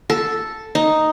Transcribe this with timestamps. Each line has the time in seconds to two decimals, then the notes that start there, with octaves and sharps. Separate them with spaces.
0.10 A4
0.75 D#4